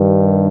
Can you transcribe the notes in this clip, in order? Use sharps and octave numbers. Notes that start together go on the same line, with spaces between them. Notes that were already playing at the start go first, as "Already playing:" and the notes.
Already playing: G2 D#3